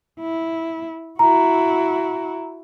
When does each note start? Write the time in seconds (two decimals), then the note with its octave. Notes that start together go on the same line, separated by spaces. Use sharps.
0.20 E4
1.19 E4 F#4 A#5